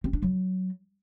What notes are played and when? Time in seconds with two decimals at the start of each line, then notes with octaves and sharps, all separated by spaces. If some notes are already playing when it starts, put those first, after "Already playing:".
0.04 C4
0.13 D4
0.22 F#3